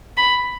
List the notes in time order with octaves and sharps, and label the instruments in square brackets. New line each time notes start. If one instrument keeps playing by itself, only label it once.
[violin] B5